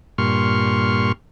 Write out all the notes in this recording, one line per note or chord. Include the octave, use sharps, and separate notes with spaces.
G2 A#2 C6 C#6 F6